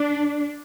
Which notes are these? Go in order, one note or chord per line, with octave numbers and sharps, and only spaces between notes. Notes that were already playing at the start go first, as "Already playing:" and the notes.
Already playing: D4